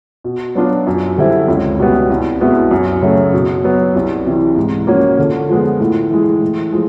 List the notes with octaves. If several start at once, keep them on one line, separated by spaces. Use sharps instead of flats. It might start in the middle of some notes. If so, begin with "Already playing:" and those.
B2
F#3 B3 D4 F4
F#2
D3 G3 C4 E4
C#2
B2 G3 B3
C2
B2 G#3 B3 E4
F#2
C#3 F#3 A3
B2
F#3 B3
C2
C3 E3
G#2
F3 A#3 C#4 F#4
D3
F3 G#3 B3
A2
E3 G#3
A2
F3 G#3